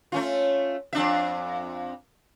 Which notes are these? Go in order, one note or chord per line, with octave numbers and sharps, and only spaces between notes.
A3 C#4 F4
F2 D4 E5